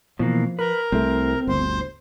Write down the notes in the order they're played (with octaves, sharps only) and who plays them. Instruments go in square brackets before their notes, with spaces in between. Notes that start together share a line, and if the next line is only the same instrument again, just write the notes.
[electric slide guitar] B2 E3 A#3 [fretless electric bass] F3
[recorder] A#4 [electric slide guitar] B4
[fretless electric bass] C2 A3 [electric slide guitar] C4
[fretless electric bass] G1 D2 [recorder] C5